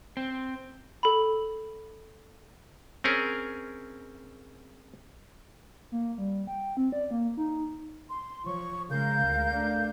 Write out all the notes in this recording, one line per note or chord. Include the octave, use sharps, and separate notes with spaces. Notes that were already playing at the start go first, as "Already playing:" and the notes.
C4
A4 B5
C4 C#4 G#4 A#4
A#3
G3
G5
C4
D5
A#3
D#4
C6
F3 C#5 C#6
C#3 G#3 A#4 F5 G6
D2 G#3
A3 D4